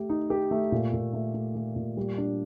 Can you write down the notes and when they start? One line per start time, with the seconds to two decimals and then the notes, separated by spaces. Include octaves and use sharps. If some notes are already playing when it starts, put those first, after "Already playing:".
Already playing: A3 G4
0.09 D#4
0.30 G4
0.51 A3
0.72 A#2
0.93 A#2
1.13 A3
1.34 A3
1.55 A3
1.76 A#2
1.97 G3
2.18 D4